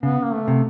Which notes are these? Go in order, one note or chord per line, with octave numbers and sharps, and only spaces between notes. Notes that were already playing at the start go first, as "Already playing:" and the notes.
C#3 B3
A#3
A3
C3